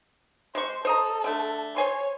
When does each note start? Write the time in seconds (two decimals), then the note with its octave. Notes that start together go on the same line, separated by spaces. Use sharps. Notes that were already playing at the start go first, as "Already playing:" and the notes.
0.55 G#3 C5 C#6
0.85 A4 C5 D#5 A#5
1.24 D3 A3
1.76 C5 C#5 G#5 C6